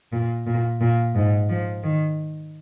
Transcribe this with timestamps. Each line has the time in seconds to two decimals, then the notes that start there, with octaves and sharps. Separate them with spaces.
0.12 A#2
0.47 A#2
0.81 A#2
1.15 G#2
1.49 F3
1.83 D#3